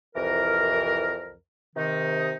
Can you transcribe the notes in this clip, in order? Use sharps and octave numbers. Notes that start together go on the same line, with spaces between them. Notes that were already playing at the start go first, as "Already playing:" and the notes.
C2 F2 E3 A#4
C3 D#3 D#4